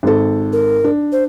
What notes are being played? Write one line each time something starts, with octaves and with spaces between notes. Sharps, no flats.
G#1 A4
A#4
D4
C5